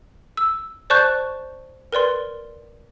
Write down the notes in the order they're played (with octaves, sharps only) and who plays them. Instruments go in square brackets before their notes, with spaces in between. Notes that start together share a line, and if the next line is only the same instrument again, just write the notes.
[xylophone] E6
C5 D5 A5 C#6 F#6 G6
A#4 B4 D5 C6